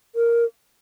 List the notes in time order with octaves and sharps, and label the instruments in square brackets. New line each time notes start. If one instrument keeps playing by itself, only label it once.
[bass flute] A#4